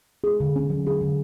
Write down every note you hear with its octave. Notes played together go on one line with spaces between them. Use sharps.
G#4
D3
C#4
F#3
G#4
D3